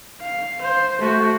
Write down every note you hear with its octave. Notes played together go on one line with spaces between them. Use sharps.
F5
C5
A3 F#4